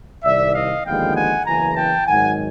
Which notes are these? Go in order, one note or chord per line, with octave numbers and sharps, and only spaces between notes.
C2 C3 D#3 D5 E5
D#5 F5
D#2 D3 F3 G#3 B3 F5 G5
F#5 G#5
F#1 E2 C#3 E3 G#5 A#5
G5 A5
G#1 G#2 D#3 F#3 F#5 G#5